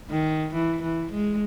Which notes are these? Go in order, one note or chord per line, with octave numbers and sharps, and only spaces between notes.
D#3
E3
E3
G#3